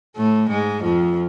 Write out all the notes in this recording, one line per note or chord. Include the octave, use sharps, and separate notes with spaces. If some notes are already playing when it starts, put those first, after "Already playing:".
A2 A3
G#2 G#3
F2 F3